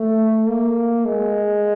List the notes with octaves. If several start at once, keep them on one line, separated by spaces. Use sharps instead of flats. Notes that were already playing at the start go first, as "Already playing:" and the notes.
Already playing: A3
A#3
G#3